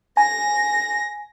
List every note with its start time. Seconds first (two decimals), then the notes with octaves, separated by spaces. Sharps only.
0.17 G#5 A#6